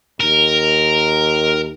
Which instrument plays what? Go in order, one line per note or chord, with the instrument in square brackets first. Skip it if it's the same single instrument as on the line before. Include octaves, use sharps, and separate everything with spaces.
[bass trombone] D#2 [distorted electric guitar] A#4